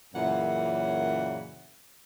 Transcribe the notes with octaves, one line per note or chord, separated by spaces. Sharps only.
F#2 A#2 C#3 E3 F#5